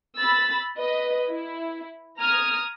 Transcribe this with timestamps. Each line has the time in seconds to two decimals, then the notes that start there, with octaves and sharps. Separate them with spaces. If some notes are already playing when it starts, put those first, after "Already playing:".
0.18 B5 E6 A6
0.76 B4 D#5
1.30 E4
2.18 A#5 D#6 F6 G#6